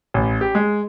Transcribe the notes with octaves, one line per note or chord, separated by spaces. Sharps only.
A1
G4
G#3